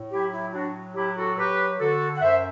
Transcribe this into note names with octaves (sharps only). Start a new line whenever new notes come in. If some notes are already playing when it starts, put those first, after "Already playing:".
Already playing: A2
F#3 E4 G4
E4
A2 D4 F#4
F#3 E4 G4
F#4 A4
F#3 G4 B4
D3 F#4 A4
F#5
F#2 C5 E5